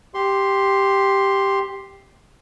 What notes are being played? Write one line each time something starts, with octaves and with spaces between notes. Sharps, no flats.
G4 C6